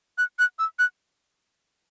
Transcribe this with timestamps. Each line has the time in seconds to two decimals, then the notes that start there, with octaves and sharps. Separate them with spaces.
0.18 F#6
0.39 F#6
0.59 E6
0.79 F#6